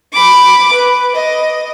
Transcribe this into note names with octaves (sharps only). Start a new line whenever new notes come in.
B5 D6
B4
D#5